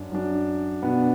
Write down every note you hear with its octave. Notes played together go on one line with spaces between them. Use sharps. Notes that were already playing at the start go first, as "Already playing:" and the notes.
Already playing: F#2 F#3 D4
F#2 F#3 D4
B2 B3 D4